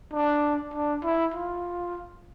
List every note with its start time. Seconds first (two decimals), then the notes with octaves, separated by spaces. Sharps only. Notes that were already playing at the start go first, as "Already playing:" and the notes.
0.13 D4
0.74 D4
1.04 E4
1.34 F4